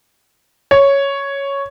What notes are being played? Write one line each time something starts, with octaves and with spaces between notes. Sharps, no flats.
C#5